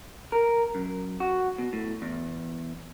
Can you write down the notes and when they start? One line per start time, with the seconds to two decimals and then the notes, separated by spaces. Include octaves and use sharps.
0.32 A#4
0.75 F#2
1.20 F#4
1.58 B2
1.73 A2
2.02 E2